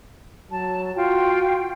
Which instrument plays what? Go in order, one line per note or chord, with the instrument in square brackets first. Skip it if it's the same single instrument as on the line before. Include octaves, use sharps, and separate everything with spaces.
[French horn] F#3 [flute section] A5
[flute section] F4 G5 [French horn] F#4